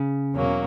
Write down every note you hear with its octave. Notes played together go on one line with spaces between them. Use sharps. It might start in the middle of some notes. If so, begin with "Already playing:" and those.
Already playing: C#3
E2 B2 F#3 A#3 C#4